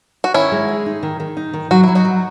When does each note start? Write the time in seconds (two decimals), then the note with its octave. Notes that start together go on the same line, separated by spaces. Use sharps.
0.24 F#4
0.34 D#3 C#4 E4
0.52 G#3
0.68 G#4
0.86 D#4
1.03 D#3
1.20 D#3
1.37 D#4
1.53 D#3
1.71 F#3 F#4
1.84 F#3 E4
1.95 D#4 F#4
2.05 F#3